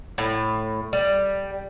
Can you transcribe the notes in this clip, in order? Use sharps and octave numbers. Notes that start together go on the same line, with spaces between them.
A2
G3